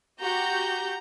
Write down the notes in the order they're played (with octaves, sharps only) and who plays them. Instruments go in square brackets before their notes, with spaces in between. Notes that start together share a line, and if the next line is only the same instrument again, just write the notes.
[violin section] F#4 G4 G6 [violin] A#5